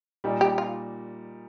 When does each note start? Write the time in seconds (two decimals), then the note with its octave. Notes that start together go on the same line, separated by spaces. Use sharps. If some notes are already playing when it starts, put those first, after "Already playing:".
0.24 A#2 G3 D#4
0.41 G4
0.58 F4